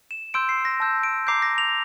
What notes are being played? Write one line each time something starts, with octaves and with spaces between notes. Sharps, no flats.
E7
C6 E6 G6 D7
C7
A#6
A5 E6 G6
D7
A#5 D6 G6 C7
A#6
F7